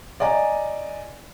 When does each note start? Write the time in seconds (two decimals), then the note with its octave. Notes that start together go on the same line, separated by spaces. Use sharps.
0.20 D5 D#5 G#5 A#5